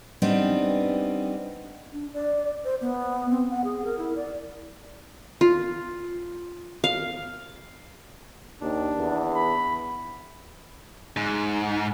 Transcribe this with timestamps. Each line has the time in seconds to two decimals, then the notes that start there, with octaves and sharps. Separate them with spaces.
0.22 G3 B3 C4 D4 D#4
1.93 D4
2.14 D5
2.64 C5
2.82 B3
3.31 C4
3.51 F#5
3.64 G#4
3.85 A#4
3.99 E4
4.16 D5
5.41 F4
6.84 F5
8.61 D#2 D4
8.97 E2
9.34 B5
11.17 G#2